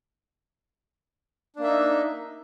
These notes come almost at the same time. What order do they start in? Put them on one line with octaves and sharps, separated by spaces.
D4 A#3 E5 D#4